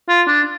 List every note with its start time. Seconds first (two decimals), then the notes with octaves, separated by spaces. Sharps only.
0.08 F4
0.27 D4